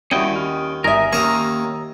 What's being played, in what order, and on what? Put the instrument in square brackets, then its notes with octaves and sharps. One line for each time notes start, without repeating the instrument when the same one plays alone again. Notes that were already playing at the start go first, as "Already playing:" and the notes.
[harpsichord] D#2 [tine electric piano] G3 E4 F#4 [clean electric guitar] C#4 D#4 G5
[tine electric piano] F6
[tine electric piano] G1 G#5 [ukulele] D#4 E5 [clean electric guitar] A#4
[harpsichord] D#2 A#4 C#6 [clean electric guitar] A#3 C#4 [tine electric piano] A#5 D#6 E6